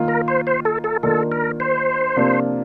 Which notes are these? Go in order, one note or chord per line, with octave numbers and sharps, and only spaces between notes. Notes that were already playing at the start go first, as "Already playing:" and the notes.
Already playing: D#3 A#3 F4
A#4
C5
C5
A4
A4
D#3 A#3 D4 F4 A4
A#4
C5
C3 F3 A#3 D4 F4